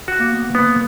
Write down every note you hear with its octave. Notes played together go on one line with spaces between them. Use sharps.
F#4
A#3
B3
A#3
B3